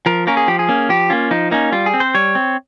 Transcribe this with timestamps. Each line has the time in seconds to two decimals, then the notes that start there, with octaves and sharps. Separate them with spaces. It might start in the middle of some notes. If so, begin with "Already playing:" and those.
0.06 F3 A#4
0.27 A#3 C#4 A#4
0.37 G#4
0.48 F3 G4
0.59 G#4
0.68 A#3 C#4
0.89 F3 G4
1.10 A#3 C#4 F4
1.31 F3 D#4
1.51 A#3 C#4 D#4
1.72 G3 F4
1.86 G#4
1.94 C4
2.00 C5
2.15 G3 C#5
2.35 C4